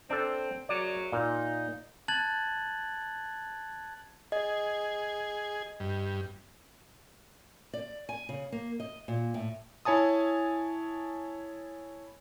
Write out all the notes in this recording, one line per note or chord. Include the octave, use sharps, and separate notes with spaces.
C4 D4 A4
F#2 C#3 F#3 D5
A#2 D#4
A5 F#6 G#6 A6 F#7
G#4 D#5
G2
D5
G#5
C#3
A#3
D#5
A#2
A2
E4 C#5 G#5 A5 D#6